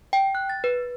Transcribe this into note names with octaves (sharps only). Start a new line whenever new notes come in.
G5
F#6
A6
B4